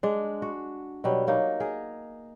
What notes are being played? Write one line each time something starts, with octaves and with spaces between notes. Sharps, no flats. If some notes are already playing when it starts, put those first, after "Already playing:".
G#3 D4
F#4
B2 F#3 G3
F#3 A#3 D#4
G#4 A#4